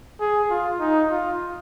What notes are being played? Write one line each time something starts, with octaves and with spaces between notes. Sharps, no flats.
G#4
F4
D#4
F4